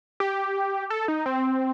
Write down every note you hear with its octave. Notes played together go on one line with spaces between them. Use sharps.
G4
A4
D#4
C4